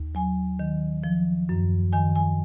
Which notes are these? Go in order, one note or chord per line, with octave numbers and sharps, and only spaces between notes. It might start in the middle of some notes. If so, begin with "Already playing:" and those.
Already playing: D#2
F#3 G#5
D#3
F3
F#2
D#3 G#5
G#5